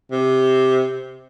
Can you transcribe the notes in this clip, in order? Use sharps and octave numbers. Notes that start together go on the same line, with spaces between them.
C3